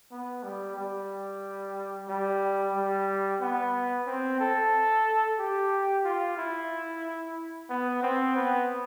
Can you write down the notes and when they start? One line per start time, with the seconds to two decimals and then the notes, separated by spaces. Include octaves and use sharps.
0.12 B3
0.43 G3
0.77 G3
2.09 G3
2.75 G3
3.41 B3
4.07 C4
4.40 A4
5.39 G4
6.05 F4
6.37 E4
7.70 B3
8.03 C4
8.37 B3